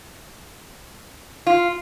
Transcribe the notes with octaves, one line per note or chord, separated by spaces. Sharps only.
F4